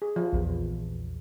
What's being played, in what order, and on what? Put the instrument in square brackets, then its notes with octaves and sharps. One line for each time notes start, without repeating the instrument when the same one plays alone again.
[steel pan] G#4
F3
[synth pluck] A#1 E2